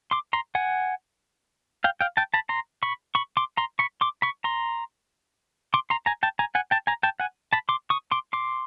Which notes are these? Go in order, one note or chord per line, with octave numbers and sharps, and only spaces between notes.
C6 D6
A#5 C6
F#5 G#5
F5 G5
F5 G5
G5 A5
A5 B5
A#5 C6
B5 C#6
B5 C#6
C6 D6
A#5 C6
B5 C#6
C6 D6
B5 C#6
A#5 C6
C6 D6
A#5 C6
G#5 A#5
G5 A5
G#5 A#5
F#5 G#5
G5 A5
G#5 A#5
G5 A5
F#5 G#5
A5 B5
C6 D6
C#6 D#6
C6 D6
C6 D6